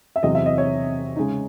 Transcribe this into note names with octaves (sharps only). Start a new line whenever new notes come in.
E5
E2 C3 F#3 C4 D#5
E5
D#5
C#5
C#3 G#3 D#4